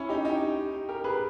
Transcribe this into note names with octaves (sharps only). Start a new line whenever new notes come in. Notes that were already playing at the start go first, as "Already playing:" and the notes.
Already playing: C#4 E4
D#4 G4
D#4 G4
G4 A#4
G#4 B4